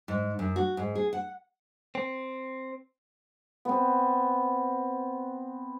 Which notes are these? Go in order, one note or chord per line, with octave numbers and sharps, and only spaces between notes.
G#2
F#2
F#4
G#2
G#4
F#5
C4
B3 C4